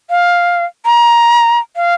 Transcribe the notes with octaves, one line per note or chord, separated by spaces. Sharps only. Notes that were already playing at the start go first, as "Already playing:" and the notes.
F5
A#5
F5